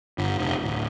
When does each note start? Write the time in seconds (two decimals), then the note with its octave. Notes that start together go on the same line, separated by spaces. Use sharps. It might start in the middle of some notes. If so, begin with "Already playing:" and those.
0.18 G1
0.39 F1
0.63 D1